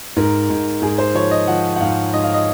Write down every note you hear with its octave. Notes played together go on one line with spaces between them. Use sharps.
G#2 A#4
G#2
G#2 G#4
C5
F3 C#5
D#5
F3 F#5
F#5
G#2 F5
G#2 D#5
F5
D#5